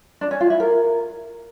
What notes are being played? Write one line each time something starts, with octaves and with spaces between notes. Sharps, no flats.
D4
C#4
F4
E4
A#4